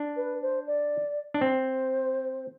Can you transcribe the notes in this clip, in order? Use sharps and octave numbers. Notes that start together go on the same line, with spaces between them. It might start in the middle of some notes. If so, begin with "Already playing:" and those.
Already playing: D4
B4
C5
D5
D4 D5
C4 C5